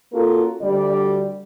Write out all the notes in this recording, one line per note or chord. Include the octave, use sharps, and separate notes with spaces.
A#3 C#4 F4 F#4 A4 A#4
D2 G3 D5